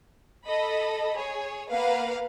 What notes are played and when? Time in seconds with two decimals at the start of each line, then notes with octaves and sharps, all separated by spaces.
0.45 A4 D#5 B5
1.16 G#4 C#5
1.70 A#3 B3 B4 F5 F#5